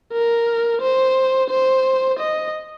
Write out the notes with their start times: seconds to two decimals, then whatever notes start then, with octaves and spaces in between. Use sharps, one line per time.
0.13 A#4
0.81 C5
1.50 C5
2.19 D#5